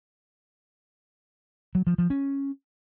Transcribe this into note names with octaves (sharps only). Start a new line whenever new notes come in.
F#3
F3
F3
C#4